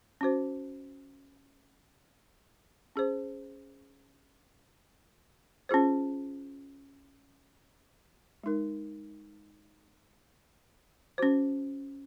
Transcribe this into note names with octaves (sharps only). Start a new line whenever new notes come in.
C#4 F#4 C5
C#4 G#4 C5
C#4 F4 G#4 C5
G#3 D#4 A#4
C#4 F#4 C5